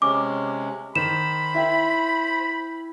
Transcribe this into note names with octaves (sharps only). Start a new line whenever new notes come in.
C3 G#3 C#4 D6
D#3 C5 B5 E7
E4 E5 G5